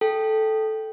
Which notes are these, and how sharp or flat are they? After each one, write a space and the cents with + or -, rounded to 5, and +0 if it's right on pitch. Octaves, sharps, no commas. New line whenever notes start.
A4 -5 G5 -5